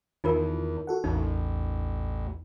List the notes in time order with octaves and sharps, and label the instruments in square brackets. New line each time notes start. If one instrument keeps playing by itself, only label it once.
[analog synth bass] E2 [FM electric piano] D#3 [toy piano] D#4 F4 A#4
[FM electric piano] F#4 A4 F#5
[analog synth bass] A1 [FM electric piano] E2 [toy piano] D#4